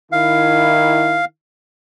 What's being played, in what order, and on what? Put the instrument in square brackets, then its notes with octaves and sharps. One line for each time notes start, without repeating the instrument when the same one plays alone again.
[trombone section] D#3 E4 [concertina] F5